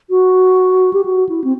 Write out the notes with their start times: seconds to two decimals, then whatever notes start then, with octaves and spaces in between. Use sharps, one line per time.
0.10 F#4
0.93 G4
1.05 F#4
1.29 E4
1.44 C4